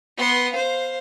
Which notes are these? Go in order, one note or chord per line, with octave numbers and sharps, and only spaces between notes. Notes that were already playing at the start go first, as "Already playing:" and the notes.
B3 C6
C5 F5